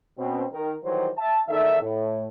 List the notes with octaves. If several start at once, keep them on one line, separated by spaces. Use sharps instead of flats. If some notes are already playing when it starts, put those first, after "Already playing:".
B2 C4 C#4
D#3 A#4
D#3 E3 F#3 G3 C5
E5 A5
E2 D#3 D4 D#4 A4 E5
A2